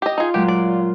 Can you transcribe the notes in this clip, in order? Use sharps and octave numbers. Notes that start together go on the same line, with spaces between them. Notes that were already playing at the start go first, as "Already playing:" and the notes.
G4 D#5
D#4 F4 G#4
A#2 F#3 G#3 G4
D5